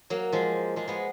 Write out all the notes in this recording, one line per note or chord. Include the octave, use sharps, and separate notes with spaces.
F#3 A#3
F3 G#3
F3 G#3
G#3 B3